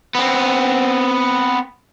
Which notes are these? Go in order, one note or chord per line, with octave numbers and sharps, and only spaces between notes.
B3 C4